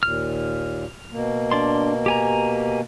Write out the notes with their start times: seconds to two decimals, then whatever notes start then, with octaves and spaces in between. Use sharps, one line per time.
0.03 D#2 A#2 F6
1.12 B2 A#3
1.51 D4 D5 C6
2.06 G4 G#5 A#5